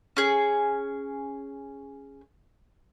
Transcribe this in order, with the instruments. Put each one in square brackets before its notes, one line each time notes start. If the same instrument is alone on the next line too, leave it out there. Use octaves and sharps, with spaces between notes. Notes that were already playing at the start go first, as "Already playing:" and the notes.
[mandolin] C#4 G#4